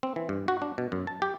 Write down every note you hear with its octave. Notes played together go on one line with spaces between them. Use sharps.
C4
E3
G2
F#4
D4
B2
F#2
A5
G4